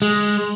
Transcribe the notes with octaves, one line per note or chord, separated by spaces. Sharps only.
G#3